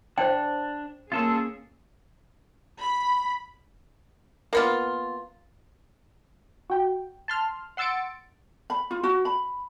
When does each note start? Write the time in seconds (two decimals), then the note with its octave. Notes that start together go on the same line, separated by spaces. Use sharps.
0.18 D4 C5 G5
1.12 A#3 C#4 F4 G#4 A4 E6
2.79 B5
4.53 A#3 B3 F4
6.70 F#4 G5
7.28 A5 C6 F6
7.77 F#5 C6 E6 A6 C#7 D7
8.70 B5
8.91 F4
9.03 F#4
9.25 B5